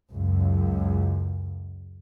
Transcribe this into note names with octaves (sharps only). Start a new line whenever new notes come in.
C#2 F#2